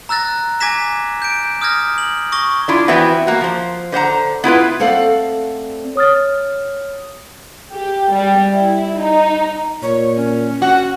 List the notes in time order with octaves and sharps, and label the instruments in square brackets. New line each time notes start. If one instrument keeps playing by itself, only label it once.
[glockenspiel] A#5 E6 F#6 A6 A#6
G#5 D6 G#6 A#6 B6 E7
G6 D7
D#6 F6 G6 G#6 A#6
F#7
C#6 D#6 A#6 G7
[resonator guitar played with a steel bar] D4 E4 F4
E3 B3 C4 E4 F#4
A#3 F#4
F3 C5
D3 C5 F#5 A#5
B3 E4 F4 B4
[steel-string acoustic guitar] A3 C4 A4 D5 F5 F#5
[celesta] C#5 D#6 F6 A6
[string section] G4
G3
E4
D#4
[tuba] A#2 [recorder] C#5
[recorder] C#4
[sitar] F#4